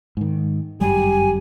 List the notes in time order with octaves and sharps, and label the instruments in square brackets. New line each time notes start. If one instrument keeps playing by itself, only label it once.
[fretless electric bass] G#2 D#3
[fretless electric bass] G1 F#2 G3 [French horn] G4 [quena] G#5